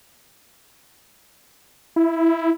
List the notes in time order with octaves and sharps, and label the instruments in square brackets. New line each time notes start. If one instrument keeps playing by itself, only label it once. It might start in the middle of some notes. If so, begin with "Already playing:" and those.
[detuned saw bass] E4